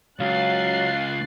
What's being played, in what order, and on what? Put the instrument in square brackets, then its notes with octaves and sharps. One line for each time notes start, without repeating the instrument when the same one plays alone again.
[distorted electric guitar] C#2 [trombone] F#3 [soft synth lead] F5 [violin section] F#6 A6 C7